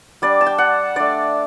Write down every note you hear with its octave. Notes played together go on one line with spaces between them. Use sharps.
G3 D4 D5
A5
G5
F#5
A3 D4 D5